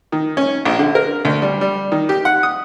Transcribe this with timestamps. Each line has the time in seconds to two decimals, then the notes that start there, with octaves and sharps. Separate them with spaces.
0.12 D#3
0.37 C#4
0.65 A#1
0.79 D3
0.95 A#4
1.25 D2
1.42 G3
1.61 G3
1.92 D#3
2.09 G4
2.25 F#5
2.43 D#6